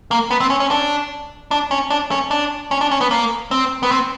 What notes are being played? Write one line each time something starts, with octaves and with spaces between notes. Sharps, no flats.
A#3
B3
C4
C#4
C#4
D4
D4
C#4
D4
C#4
D4
C#4
D4
C#4
B3
A#3
C4
B3
C4